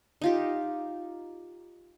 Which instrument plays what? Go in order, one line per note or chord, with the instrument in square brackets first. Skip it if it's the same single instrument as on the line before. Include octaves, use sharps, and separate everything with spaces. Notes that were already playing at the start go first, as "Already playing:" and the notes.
[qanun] D#4 F4 G4